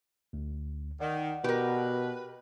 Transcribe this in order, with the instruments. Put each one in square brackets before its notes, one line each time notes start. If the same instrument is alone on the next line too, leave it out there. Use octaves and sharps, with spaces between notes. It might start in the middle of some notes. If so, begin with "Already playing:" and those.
[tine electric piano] D2
[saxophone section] D#3 [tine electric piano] D5 F#5
[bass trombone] B2 [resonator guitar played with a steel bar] G4 A#4 [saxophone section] B4